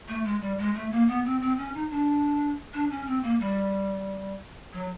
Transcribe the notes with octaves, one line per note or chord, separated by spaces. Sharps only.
A3
G#3
G3
G#3
A3
A#3
B3
C4
C4
C#4
D#4
D4
D4
C#4
C4
A#3
G3
F#3